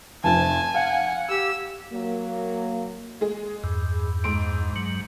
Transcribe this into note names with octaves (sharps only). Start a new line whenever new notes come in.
F1 F3 G#5 A5
F5 F#5
G4 E6
F#3 A#3
G#3 G#4
E2 G2
G#2 C6 D7
G2 F#3